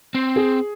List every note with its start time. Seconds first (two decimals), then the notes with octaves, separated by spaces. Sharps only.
0.15 C4
0.36 G#4